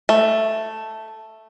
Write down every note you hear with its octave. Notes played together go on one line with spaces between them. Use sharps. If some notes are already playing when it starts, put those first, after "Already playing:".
A3